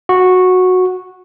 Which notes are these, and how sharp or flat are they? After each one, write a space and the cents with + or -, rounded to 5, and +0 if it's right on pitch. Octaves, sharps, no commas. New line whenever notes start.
F#4 -10